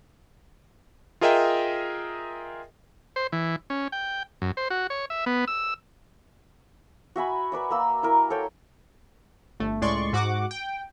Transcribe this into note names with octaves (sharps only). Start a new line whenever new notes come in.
F4 G#4 A#4 D#5 E5 G5
C5
E3
C#4
G5
F#2
C5
F#4
C#5
E5
B3
E6
F#4 E5 G#5 B5
B4 D5 E5
A#3 E6
E4 A#4
A4 C#5 G5
G1 A3
C#2 A2 G#3 D5 C6 C#6
G#2 F#4 F#5 D6
G5